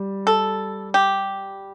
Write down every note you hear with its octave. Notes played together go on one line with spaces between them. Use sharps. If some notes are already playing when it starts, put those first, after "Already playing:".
Already playing: G3
A4
G4